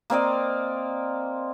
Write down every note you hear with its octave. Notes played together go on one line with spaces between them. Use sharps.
A#3 C4 D5 D#5